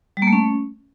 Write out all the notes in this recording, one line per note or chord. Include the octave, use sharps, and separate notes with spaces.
G3
A#3
A3
C#4